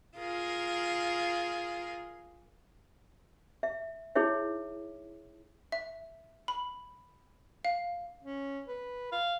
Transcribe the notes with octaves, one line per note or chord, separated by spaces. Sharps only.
F4 G#4 A#4
E5
D#4 E4 G#4 C#5 E5
E5
B5
F5
C#4
B4
F5